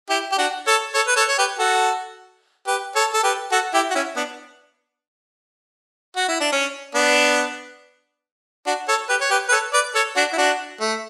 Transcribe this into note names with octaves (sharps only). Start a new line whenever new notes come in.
E4 G4
G4
D4 F#4
A4 C#5
A4 C#5
B4
A4 C#5
C#5
G4 B4
F#4 A4
G4 B4
A4 C#5
A4
G4 B4
F#4 A4
E4 G4
F#4
C#4 E4
B3 D4
F#4
E4
D4
C#4
B3 D4
D4 F#4
A4 C#5
G4 B4
C#5
G4 B4
B4
A4 C#5
B4 D5
A4 C#5
D4 F#4
E4
D4 F#4
A3